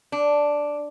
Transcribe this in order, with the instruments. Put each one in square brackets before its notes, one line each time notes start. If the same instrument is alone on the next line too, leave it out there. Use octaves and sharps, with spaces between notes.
[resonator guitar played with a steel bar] D4